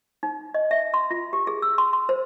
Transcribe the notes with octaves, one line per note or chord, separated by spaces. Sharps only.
D#4
D#5
E5
C6
F4
G4
G#4
E6
C6
C6
C5